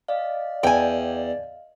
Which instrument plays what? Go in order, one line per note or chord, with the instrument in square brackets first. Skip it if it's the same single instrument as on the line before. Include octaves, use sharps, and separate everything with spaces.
[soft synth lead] D5 [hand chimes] D#5 F5
[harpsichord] E2 [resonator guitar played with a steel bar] G5 G#5